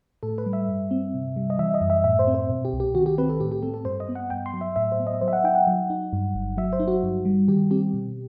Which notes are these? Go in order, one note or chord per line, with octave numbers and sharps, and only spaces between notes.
A2 A4
B4
G3
E5
G2
C4
C3
G3
D#5
E3 E5
D#5
F#2
E5
A2 E5
C5
C4
C5
B2
G4
C2
G4
D#3 F#4
G4
C4 B4
A4
A2 G4
G4
C4 A4
A4
G2 C5
D#5
B3
F#5
G2 G5
C6
F#3
E5
A2 E5
C5
B3
D#5
F#3 C5
E5
F#5
D#4 G5
F#5
F#3
D#4
G2
G1
F#3 E5
C5
D#4
F#4
G2
G3
D#3 G4
C4 G4
B2